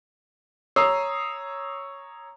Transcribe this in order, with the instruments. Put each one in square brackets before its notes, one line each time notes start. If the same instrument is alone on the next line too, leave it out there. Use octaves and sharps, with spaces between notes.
[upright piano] C#5 A#5 D#6 E6 C7